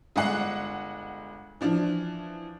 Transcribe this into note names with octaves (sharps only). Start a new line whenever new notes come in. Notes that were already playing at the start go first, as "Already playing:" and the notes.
G1 G#3 F#5 C7
E3 F3 D4